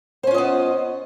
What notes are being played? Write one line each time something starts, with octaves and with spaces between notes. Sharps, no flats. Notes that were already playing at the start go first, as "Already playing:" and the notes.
B3 C#4 F4 C5 D#5